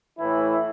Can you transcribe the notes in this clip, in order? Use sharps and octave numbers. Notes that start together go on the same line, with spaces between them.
A2 E3 E4